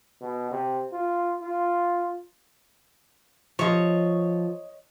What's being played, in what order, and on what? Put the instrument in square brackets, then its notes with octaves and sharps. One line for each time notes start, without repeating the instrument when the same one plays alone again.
[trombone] B2
C3
F4
F4
[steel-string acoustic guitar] F3 [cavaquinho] C#5 D#5